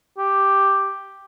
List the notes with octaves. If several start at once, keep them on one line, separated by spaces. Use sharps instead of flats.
G4